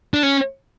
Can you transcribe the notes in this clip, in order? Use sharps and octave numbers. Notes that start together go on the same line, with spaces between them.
D4
C#4